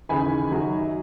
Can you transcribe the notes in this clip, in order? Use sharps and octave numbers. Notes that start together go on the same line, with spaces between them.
D#2 C#3 E3 G#5 B5
F#2 D#3 F#3